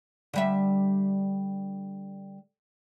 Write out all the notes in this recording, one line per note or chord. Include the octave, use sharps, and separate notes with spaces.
D3 G3 E5